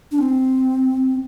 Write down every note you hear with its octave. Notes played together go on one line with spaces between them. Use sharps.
D4
C4